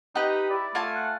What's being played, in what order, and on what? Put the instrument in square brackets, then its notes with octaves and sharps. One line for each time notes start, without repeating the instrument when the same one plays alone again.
[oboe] D#4 [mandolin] G4 B4 [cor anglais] D#5
[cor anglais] E4 [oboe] D5
[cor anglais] A3 [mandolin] F4 G#5 A5
[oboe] F#5